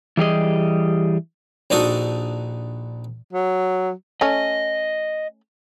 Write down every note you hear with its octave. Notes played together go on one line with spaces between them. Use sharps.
E3 G3 G4 G#4 D#5
A#1 D4 D#4 F#4 A4 D#6
F#3
A3 C#4 D#5